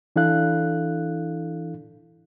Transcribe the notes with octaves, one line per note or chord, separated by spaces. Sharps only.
E3 D4 E4 A4 F5 F#6